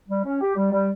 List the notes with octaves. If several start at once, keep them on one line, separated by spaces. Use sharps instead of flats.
G3
C#4
G4
G3
G3